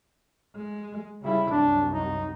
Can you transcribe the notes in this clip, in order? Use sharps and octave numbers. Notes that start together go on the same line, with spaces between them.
G#3
C#3 G3 E4
C2 F#2 D4
D#4